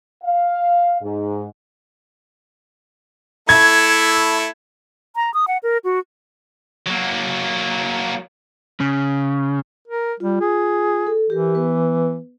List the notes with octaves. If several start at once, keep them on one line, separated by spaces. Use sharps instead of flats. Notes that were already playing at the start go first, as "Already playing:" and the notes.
F5
G#2
A3 E4 G#6
A#5
D#6
F#5
A#4
F#4
F#3 A#3
C#3
A#4
G3 F4
G#4
A4
E3 G4 A#4
B3 B4